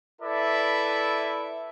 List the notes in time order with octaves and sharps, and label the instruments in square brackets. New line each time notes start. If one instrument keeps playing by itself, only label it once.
[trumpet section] E4 A4 B4 D5 E5